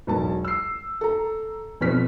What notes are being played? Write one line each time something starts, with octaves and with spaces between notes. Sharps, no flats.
E1 B1 F#3 A5
E6 C7
A4 A#5
F2 B2 C4 F6 B6